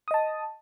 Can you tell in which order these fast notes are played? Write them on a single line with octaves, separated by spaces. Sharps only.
D#6 D#5 A5